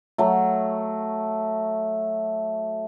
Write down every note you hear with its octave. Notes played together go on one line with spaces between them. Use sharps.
F#3 A3